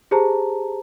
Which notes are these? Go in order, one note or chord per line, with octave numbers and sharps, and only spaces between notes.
G4 G#4 C5 A5 A#5